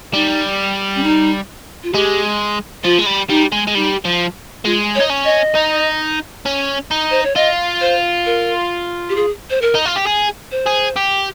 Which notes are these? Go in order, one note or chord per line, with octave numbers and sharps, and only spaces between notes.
G3 D#4
C#4
D#4
F4
G#3 G4
F3 F4
G#3
G3
G3 D#4
G#3
G#3
G3 D#4
F3
G#3 F4
C#5
D#4
C#4
D#5
D#4
C#4
D#4
C5
C#5
F4 D#5
C5
A#4
G4
G#4
C5
A#4
D#4
F4
G4
G#4
C5
G#4
G4